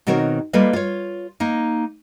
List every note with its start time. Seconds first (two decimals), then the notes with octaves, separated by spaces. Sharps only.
0.07 B2 D#3 C4 F#4 A#4 C#5
0.53 G3 A#3 F4 A4 B4 D#5
0.73 F4 C#5
1.40 A#3 D#4